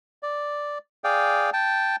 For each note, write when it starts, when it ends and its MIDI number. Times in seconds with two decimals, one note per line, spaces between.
0.23 0.78 74
1.04 1.50 68
1.04 1.50 74
1.04 1.50 77
1.04 1.50 79
1.53 1.96 79
1.53 1.96 81